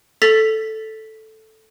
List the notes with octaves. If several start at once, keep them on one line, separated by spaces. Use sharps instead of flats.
A4 A6 B6 F7